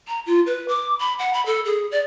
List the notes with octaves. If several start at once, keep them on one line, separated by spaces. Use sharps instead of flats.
A#5
F4
B4
D6
B5
F#5
B5
A4
G#4
D5